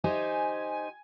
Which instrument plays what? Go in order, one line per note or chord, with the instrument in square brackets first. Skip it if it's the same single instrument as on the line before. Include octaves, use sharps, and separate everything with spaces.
[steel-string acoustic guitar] D#4 G4 C5 [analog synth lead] G#5